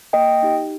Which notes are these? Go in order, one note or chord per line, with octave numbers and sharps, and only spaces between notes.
A#3 D#5 G5
D#4 G4